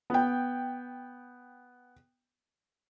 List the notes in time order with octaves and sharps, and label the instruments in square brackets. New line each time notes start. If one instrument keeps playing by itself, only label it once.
[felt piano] B3 G5